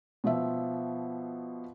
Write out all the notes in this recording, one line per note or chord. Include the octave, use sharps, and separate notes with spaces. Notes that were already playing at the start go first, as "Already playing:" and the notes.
B2 F3 E5